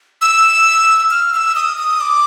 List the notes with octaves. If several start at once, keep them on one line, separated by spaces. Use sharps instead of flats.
E6
F6
F6
E6
D#6
D#6
D6